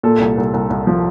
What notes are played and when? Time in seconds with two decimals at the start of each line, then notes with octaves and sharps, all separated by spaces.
0.03 A#2 A4
0.20 C2
0.38 C2
0.54 C2
0.70 C2
0.87 F3